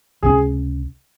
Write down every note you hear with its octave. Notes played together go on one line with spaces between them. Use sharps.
C#2 C3 G3 C#4 G#4